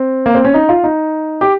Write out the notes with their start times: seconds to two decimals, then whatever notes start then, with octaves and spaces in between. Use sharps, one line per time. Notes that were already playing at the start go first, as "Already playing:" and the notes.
Already playing: C4
0.26 A#3
0.35 C4
0.45 C#4
0.54 D#4
0.69 F4
0.84 D#4
1.41 G4